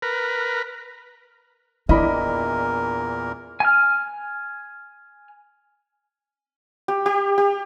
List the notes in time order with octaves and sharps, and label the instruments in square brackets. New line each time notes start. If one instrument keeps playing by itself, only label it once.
[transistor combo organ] A#4 B4
[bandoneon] E2 A#2 A#4 [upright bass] D4 [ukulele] E4 D5 [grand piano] D#5 B5
[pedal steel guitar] G#5 F6
[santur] G4
G4
G4